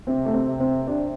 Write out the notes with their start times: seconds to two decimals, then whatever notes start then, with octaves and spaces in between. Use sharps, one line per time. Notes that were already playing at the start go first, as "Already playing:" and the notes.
0.07 C3 C4
0.25 A3
0.34 C4
0.47 C3
0.60 C4
0.87 C3 D4